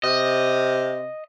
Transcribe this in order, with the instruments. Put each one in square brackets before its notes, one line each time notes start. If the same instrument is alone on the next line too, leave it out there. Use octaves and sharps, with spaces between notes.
[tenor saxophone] C3 [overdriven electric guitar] D#5